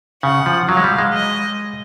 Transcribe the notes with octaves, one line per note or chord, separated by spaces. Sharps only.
C#3 F#5
F3
F#3 F5
G#3
G3
G#3
D#5